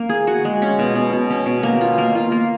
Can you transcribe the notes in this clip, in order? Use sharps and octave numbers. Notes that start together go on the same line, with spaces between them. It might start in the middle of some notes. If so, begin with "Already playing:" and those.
Already playing: A#3
G#4
F#4
G#3
C#4
B2
B2
B2
C#4
B2
A#3
F4
A#3
F4
A#3